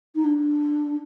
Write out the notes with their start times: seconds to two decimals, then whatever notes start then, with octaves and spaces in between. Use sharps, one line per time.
0.15 D#4
0.24 D4